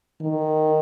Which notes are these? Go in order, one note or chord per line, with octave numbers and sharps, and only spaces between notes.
D#3